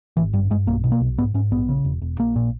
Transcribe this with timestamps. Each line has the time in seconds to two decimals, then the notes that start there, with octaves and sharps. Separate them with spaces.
0.17 G#1 E3
0.33 G2 G3
0.50 G2 G#3
0.67 B1 A#3
0.84 B2
0.92 A#3
1.01 B1
1.18 G#2 B3
1.34 G#2 C#4
1.51 A#1 B3
1.69 C#3
1.84 E1
2.02 E1
2.18 A#1 A#3
2.36 A#2